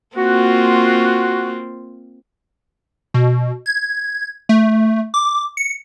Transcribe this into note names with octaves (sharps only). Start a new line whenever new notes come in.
A#3 C4 F4 F#4
B2
G#6
A3
D6
C#7